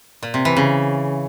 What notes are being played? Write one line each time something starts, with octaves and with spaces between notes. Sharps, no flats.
A#2
C3
E3
C#3